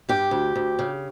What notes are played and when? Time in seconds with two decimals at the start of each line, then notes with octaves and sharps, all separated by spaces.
0.09 G2 G4
0.31 D2
0.56 D2
0.79 C#3